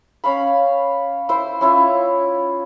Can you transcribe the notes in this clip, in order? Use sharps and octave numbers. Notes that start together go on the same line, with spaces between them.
C#4 F5 B5
E4 C5
C#4 E4 F4